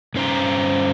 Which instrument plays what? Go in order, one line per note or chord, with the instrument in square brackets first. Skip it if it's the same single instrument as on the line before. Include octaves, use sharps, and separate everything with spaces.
[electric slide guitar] G2 C#4 C5 G5 A#5